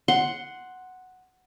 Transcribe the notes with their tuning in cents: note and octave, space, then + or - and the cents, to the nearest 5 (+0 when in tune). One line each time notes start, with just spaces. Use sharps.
F#5 +0 C6 +0